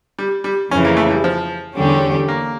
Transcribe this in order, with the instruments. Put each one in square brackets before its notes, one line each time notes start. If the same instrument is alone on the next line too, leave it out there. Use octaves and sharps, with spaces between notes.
[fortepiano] G3
G3
[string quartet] F2 C#3 E3 [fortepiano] C#4
[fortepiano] A#3
A3
G3
F3
[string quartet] E2 D3 G3 C#4 G4
[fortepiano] A#3